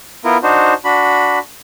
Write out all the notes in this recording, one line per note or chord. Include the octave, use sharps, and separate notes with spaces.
B3 E4 F4 A#4
D4 D#4 F#4 C5
D4 F#4 B5